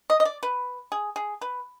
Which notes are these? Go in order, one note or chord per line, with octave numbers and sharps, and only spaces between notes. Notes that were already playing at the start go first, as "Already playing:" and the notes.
D#5
D#5
D5
B4
G#4
G#4
B4